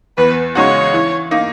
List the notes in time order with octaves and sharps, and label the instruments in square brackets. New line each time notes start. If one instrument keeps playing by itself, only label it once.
[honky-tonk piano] E2 [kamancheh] B4
[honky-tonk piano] C#3 G#3 D#4 F#4 [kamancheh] C#5
[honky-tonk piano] E3
A#3 D#4